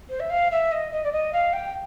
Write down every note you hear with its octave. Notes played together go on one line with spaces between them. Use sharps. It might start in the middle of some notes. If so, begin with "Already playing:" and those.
C5
E5
F5
E5
D#5
D#5
D5
D#5
F5
G5